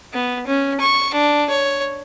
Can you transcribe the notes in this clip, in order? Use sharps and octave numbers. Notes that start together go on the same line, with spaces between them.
B3
C#4
C#6
D4
C#5